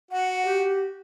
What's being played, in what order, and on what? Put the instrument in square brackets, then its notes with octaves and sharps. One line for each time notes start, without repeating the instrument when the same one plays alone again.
[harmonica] F#4 [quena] F#5
[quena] G4